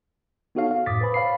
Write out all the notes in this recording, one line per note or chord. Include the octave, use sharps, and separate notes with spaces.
B3 D#4 F#4 A4 C#5 F5
F5
F#2 A2 D6 D#6 A6 B6
B4 C5 G#5 B5
C#5 F5 B5 C7